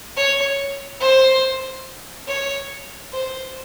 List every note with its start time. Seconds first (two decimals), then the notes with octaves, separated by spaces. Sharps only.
0.16 C#5
1.00 C5
2.27 C#5
3.13 C5